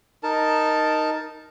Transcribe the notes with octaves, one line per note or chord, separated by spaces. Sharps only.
D#4 A#4 A5